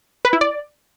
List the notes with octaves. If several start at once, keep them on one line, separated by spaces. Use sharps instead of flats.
B4
E4
D5